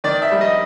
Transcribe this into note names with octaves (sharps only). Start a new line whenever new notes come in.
D#3 D5
E5
G3
D#5